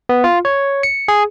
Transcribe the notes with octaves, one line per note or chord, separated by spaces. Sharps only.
B3
F4
C#5
C#7
G#4